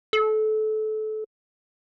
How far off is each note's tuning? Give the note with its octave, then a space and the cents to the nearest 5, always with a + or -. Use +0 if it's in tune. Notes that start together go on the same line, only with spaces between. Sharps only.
A4 -25